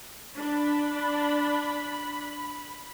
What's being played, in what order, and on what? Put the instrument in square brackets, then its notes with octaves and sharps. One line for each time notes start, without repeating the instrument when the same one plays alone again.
[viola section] D4 [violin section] B5